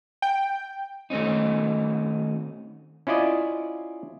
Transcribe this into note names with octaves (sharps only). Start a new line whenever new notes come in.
G5
D#3 A3 C4 C#4 D#4
C#4 E4 F4 D5 D#5